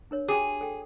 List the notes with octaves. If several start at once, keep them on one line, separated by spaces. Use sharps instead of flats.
D4 A#4 C#5
F#4 G#4 G5 D6
A4 G5